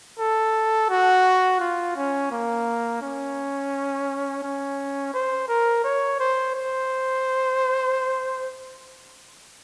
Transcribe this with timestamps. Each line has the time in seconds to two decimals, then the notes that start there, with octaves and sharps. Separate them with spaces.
0.19 A4
0.89 F#4
1.60 F4
1.96 C#4
2.31 A#3
3.02 C#4
4.43 C#4
5.14 C5
5.48 A#4
5.84 C#5
6.20 C5
6.55 C5